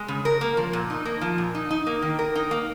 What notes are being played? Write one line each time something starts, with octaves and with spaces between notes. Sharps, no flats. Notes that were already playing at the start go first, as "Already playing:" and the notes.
Already playing: G#3
C#3
A#4
A#3
F3
A#2
D#4
A#3
F3
A#2
D#4
D#4
A#3
D#3
A#4
D#4
A#3